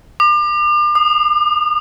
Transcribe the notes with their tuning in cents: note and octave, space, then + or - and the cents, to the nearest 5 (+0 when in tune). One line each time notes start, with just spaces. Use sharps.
D6 +35
D#6 -35